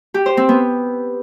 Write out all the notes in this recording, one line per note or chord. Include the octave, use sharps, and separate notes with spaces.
G4
C5
C4
B3